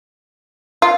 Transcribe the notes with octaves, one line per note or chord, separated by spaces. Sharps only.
F4